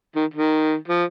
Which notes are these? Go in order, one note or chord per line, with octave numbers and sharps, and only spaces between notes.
D#3
D#3
F3